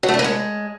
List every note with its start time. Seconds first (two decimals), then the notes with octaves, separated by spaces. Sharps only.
0.03 F#3
0.08 A3
0.14 D4
0.19 A#3
0.24 G#3